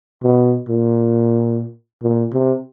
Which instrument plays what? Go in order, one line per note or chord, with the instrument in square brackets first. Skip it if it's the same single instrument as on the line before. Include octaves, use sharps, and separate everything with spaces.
[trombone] B2
A#2
A#2
C3